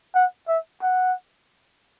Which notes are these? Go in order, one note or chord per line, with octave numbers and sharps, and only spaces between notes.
F#5
E5
F#5